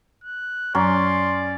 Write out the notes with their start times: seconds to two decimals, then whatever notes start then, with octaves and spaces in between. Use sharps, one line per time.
0.24 F#6
0.75 F#2 F#3 C#4 D5 A#5 C6